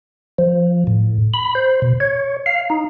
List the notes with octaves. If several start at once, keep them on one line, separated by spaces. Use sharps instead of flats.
F3
A2
B5
C5
B2
C#5
F5
D#4